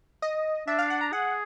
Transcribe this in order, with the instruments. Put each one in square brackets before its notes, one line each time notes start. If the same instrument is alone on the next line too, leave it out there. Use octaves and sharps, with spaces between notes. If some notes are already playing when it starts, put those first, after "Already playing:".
[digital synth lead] D#5
[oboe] D4 [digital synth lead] E5
[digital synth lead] F5
F#5
A#5
[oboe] G#4 [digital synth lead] F#5